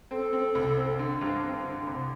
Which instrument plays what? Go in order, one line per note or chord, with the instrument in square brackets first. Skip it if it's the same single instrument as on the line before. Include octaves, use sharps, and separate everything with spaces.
[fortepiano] C4 [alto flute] A4
[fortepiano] C4
C2
C4
D3
G2
C4
D3
C2